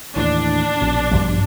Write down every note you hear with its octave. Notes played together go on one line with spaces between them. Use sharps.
D#2 A2 E3 D4
A#1 B2
G2 F3 G3